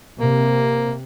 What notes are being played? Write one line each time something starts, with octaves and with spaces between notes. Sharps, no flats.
C3 A#3